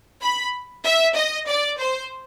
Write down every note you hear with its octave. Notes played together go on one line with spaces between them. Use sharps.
B5
E5
D#5
D5
C5